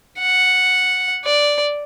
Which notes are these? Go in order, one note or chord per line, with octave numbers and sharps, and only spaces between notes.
F#5
D5